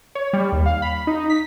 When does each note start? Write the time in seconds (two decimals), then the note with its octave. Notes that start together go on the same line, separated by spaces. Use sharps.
0.15 C#5
0.33 G3
0.52 D#2
0.66 F5
0.82 B5
1.07 D#4
1.30 B6